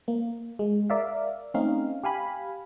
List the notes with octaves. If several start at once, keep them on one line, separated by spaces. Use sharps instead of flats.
A#3
G#3
A#4 D5 E5 F5
A3 C4 C#4 D#4 F5
G4 F5 G#5 B5